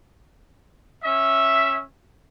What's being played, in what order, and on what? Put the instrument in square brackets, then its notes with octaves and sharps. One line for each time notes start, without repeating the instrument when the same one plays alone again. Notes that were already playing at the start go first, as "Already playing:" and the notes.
[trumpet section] C#4 E5